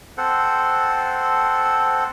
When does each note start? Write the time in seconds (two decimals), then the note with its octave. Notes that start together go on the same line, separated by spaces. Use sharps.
0.18 C4 A4 C5 F#5